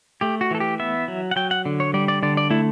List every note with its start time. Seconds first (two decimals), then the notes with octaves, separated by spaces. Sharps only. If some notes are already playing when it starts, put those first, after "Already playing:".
0.21 A3 G4
0.41 F#4
0.51 E3 A4
0.60 G4
0.79 B3 E5
1.08 F#3
1.31 F#5
1.36 F#3 G5
1.51 F#5
1.65 D3
1.80 C#5
1.94 G3 D5
2.08 D5
2.23 D3 D5
2.37 D5
2.50 A3 E4